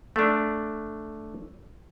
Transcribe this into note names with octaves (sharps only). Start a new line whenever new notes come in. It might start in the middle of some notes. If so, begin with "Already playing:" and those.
A3 D4